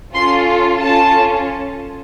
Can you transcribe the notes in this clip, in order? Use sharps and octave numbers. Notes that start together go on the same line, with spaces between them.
C#4 F4 A4 C6
C#4 F4 A4 A5